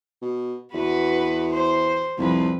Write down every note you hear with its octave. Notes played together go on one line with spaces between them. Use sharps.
B2
E2 F#4 B4
C5
C2 F2 B4